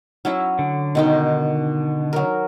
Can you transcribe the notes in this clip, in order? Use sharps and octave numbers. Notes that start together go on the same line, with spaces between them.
F#3 C#4 E4
D3
B2 D#3 G5
F#3 A#4